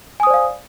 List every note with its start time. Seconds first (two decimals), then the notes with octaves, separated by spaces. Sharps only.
0.20 G#5
0.23 D#6
0.27 C5
0.30 D5
0.34 F5